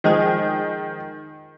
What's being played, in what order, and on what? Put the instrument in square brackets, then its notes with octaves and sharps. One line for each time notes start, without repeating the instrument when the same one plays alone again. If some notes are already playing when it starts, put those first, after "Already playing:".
[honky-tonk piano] D#3 [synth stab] F3 G#3 G#4